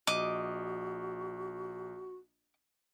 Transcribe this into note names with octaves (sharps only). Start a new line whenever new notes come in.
A#1 F#4 D#5 D6